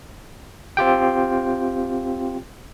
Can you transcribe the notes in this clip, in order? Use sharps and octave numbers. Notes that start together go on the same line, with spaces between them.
C4 F4 G4 G5